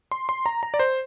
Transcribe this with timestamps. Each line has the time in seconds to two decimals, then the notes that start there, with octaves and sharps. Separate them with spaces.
0.12 C6
0.29 C6
0.46 A#5
0.63 A#5
0.74 D5
0.79 C5